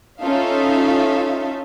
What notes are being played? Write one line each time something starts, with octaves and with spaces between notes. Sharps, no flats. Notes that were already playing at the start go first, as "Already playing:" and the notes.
C#4 D#4 F4 A4 E5 F5